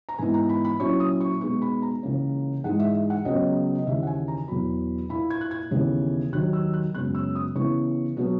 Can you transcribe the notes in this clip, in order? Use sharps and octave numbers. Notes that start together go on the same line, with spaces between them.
A#5
G#2 E3 B3 E4 G#5
A#5
B5
B5
A#2 F#3 C#4 E4 C#6
D#6
C#6
B2 G#3 B3 D#4 C#6
B5
A#5
C#2 C#3 E3 A#3 C#4
G#2 E3 G#3 D#4 F#5
E5
E5
F#5
C#2 C#3 F#3 B3 D#5
D#5
D#2 C#3 E3 E5
F#5
G#5
A#5
E2 B2 F#3 B5
A#2 A#3 E4 B5
G#6
F#6
G#6
D#2 C#3 E3 B3
D#2 D#3 F#3 F#6
E6
F#6
F#2 C#3 G#3 B3 F#6
E6
D#6
C#3 E3 B3 E4 C#6
B2 F#3 B3